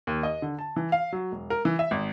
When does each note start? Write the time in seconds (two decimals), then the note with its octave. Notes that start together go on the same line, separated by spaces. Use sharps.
0.07 D#2
0.23 D#5
0.42 D3
0.59 A5
0.76 E3
0.92 F5
1.12 F#3
1.32 E1
1.50 A#4
1.65 E3
1.79 E5
1.91 G#1